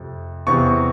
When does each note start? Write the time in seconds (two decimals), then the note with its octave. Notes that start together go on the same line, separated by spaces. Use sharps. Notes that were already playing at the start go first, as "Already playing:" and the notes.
Already playing: F2 C3
0.47 E2 C3 E3 C#6